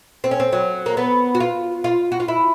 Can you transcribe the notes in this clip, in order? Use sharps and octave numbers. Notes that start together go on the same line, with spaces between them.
C4
C#4
C4
F#3
A#3
B3
F#4
F4
F4
F#4
F4
E4